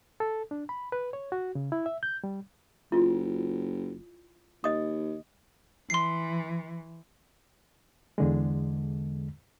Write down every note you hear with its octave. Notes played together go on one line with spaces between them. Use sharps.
A4
D4
B5
B4
C#5
F#4
C#3
E4
E5
G6
G3
F#1 E4 F4
D#2 D#5 D#6
E3 C6 C7
E2 D3 G#3